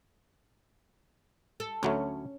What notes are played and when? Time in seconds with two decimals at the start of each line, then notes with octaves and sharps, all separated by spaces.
1.60 A4
1.83 D2 F#3 A3 C#4